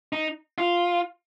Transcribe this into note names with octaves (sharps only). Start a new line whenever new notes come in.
D#4
F4